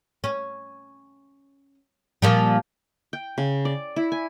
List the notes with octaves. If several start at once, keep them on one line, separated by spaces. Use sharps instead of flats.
C#4
A#2 F3 G3
G5
C#3
D5
E4
G#5